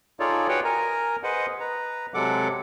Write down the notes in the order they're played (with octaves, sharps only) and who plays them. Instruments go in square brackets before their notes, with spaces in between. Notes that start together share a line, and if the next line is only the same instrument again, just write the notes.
[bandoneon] D#4 F4 G#4 A4 C#5 D5
F#4 G#4 B4 C#5 F#5 G5
A#4 G#5 A#5
G#4 B4 C5 D#5 F#5
B4 A#5
C3 F#3 G#3 A4 F#5 D6